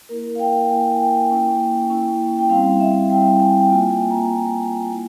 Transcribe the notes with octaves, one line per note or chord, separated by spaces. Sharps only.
A#3 E4 A#4
F5
G5
A#3 E4 G#5
G#5
G5
A#3 C#4 E4
A#3 C#4 E4
G5
G3 C4 E4 F5
E5
G3 C4 E4 G5
G#5
G5
A#3 F4 G#5
G#5
A#5
A#3 F4
A#3 E4